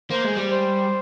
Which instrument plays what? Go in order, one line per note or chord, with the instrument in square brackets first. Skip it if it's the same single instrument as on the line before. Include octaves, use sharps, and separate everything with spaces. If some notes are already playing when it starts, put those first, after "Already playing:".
[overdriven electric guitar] A#3 [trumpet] C5
[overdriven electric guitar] G#3
G3
[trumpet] C5